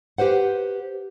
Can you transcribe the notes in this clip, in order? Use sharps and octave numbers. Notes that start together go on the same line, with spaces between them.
G4 B4 C5 F#5